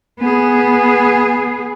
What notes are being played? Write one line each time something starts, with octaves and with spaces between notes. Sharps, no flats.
B3 G#4